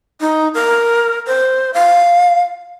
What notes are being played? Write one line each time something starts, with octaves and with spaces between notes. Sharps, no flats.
D#4
A#4
C5
F5